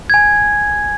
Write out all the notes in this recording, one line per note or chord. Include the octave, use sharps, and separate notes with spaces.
G#5 G#6